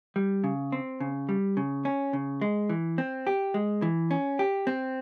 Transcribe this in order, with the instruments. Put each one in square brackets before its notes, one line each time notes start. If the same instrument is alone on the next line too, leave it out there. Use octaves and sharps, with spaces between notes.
[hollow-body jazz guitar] G3
C#3
C4
C#3
G3
C#3
C#4
C#3
G#3
E3
C4
G4
G#3
E3
C#4
G4
C4